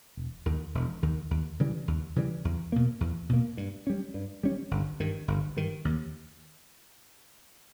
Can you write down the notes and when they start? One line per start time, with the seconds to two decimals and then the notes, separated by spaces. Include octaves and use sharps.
0.17 E1
0.46 D#2 D#3
0.75 E1
1.03 D#2 D#3
1.31 D#2
1.60 C#3 E3 G3
1.88 D#2
2.16 C#3 E3 G3
2.45 E2
2.72 B2 A#3
3.00 E2
3.29 B2 A#3
3.57 G2
3.87 G3 C#4
4.14 G2
4.43 G3 C#4
4.71 G1
5.00 G2 D#3
5.28 G1
5.57 G2 D#3
5.85 D#2